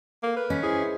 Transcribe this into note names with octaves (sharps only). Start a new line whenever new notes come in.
A#3 A4 A#4
B4 F6
C#4 D#5 B6
E4 G#4 C5 D#5
E5